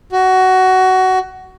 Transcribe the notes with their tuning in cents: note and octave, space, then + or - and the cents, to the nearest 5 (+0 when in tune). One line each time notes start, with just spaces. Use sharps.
F#4 +15